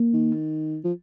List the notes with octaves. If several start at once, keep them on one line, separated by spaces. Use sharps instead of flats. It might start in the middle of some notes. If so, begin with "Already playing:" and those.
Already playing: A#3
D#3
F3